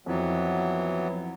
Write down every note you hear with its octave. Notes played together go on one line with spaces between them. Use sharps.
F2 E3 F#3 B3